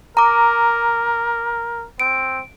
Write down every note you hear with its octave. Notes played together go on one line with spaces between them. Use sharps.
A#4 A#5 D6
C4 D7